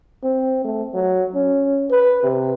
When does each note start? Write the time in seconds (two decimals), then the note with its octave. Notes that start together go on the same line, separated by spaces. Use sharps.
0.24 C4
0.64 A3
0.94 F#3
1.34 C#4
1.90 B4
2.23 C3